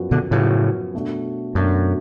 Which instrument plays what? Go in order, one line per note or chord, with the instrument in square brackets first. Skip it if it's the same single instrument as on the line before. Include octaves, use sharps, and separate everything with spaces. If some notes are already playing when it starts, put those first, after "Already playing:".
Already playing: [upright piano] F#2 F3 B3 F#4
[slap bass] B2 D3
[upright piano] F#2 F3 B3 F#4 [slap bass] A2 C#3
[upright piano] B2 A3 D4 F#4
[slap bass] F#2 [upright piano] B2 A3 D4 F#4